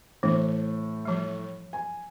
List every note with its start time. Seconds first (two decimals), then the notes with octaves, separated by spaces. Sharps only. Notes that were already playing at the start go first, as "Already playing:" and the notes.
0.23 A2 E3
1.05 F3 G3
1.73 G#5